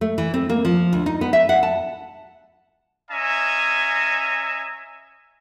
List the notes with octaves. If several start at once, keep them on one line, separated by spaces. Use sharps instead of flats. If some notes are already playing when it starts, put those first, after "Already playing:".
A3
E3
C4
A#3
F3
D2
D#4
B3
E5
F#5
A5
C#4 D#5 E5 G#5 A#5